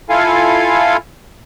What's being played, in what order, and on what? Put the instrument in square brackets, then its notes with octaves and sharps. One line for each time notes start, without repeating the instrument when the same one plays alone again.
[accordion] E4 F4 A4 F5 G#5